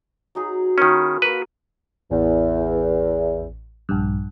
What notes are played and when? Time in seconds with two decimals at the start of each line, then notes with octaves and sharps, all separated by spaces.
0.35 F#3 D#4 G#4
0.78 D#3 A#3 C#4 F4 B5
1.22 A#3 F#4 A#4 B4
2.11 A1 E2
3.89 A#1 G2